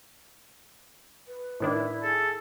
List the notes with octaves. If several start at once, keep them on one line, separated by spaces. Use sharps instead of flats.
B4
A2 D#3 D4 E4
G#4 A4